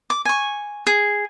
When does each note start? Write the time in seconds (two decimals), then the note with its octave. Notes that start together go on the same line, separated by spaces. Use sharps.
0.10 D6
0.25 G#5 C#6
0.87 G#4